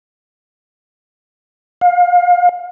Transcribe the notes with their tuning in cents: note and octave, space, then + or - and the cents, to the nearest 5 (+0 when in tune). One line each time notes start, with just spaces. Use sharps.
F5 +30